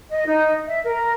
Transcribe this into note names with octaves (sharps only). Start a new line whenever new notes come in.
D#5
D#4
E5
A#4